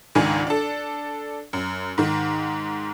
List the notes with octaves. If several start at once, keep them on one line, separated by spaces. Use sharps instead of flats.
C#2 G#2 D#3 D4 G#5
D4 A4
F#2
G#2 D#3